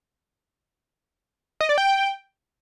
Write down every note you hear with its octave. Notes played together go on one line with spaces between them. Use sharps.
D#5
D5
G5